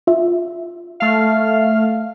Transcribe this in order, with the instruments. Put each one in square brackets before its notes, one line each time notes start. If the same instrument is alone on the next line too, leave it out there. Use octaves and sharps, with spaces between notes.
[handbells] F4 E5
[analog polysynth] A3 F5